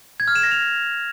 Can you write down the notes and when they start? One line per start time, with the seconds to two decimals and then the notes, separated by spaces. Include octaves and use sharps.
0.20 G#6
0.28 F6
0.35 E7
0.43 A#6
0.51 F7